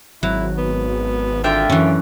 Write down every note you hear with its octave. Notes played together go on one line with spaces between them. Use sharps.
G#1 F#3 E4
B3
D3 F4 E5 G5
F#2 E3 C#4